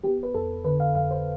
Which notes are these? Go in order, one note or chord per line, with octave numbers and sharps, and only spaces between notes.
B3 G4
B4
F2 A4
D3 B4
F5
F2 F5
C5